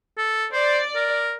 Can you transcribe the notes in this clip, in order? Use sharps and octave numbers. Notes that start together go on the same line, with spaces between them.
A4
C5 D5
A#4